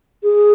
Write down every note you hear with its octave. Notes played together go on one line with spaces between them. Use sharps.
G#4